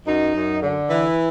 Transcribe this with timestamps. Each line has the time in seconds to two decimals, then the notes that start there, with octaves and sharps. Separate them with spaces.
0.06 F#2 D#4
0.34 F#2
0.62 D3
0.90 E3